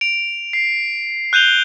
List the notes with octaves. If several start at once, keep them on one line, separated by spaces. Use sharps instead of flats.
D7 F7
C7
F#6 G6 D#7 F7 G7